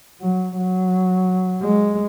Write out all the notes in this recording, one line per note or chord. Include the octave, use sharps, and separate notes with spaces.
F#3
F#3
G#3